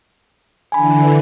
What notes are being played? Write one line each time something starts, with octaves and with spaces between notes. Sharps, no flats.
D3 E3 G#5 B5